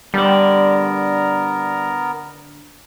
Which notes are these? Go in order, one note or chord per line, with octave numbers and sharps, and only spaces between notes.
D3 G3 B3 A#4 D5 A#5